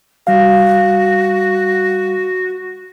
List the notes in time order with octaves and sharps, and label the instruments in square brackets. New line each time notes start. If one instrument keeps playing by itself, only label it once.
[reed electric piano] G3 F5 [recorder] F#4